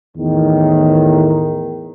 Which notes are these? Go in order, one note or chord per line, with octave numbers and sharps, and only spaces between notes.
E2 A2 D#3